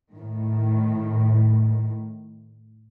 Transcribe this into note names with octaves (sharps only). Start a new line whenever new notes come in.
A2 D#3